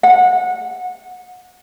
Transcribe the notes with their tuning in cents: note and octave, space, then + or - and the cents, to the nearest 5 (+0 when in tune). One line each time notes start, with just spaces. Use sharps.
F#5 -25